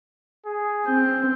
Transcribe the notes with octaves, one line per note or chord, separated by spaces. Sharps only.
G#4
C4 G6